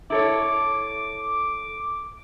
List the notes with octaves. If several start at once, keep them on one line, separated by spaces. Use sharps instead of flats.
E4 A4 C#5 D6